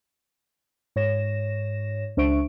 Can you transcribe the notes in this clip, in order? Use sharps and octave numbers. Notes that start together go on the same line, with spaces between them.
G#2 C#5 A#6 E7
C#2 D4 C5 E5 C#6 D7